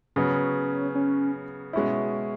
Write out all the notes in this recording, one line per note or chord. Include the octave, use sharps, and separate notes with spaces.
C#3 F#3 B3 C#4
C#4
B2 G#3 C#4 E4